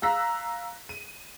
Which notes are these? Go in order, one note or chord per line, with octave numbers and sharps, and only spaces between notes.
F5 A#5 E6 F#6 A#6 B6
D#7